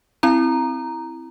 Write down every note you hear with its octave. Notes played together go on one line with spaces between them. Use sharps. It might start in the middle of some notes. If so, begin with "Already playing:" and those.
C4 E4 A#5